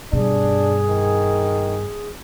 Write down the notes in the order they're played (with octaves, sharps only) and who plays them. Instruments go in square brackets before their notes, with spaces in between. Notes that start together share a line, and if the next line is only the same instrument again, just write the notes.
[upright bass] G2 B2 [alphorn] D4 [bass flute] G#4
[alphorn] D#3